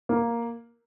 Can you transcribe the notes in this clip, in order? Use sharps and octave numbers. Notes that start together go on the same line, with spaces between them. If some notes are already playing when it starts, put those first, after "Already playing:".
A#3